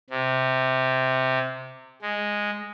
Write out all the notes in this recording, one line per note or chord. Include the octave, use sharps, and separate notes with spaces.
C3
G#3